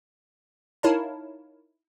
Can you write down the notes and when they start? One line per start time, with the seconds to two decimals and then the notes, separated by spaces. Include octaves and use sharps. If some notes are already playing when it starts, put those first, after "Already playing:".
0.83 D#4 E4 A#4 C#5 F5 A5